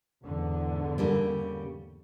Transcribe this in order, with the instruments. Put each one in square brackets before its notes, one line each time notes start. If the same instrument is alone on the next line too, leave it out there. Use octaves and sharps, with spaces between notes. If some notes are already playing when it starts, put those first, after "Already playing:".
[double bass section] E2 G#2 D3
[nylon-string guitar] C#3 G3 A#3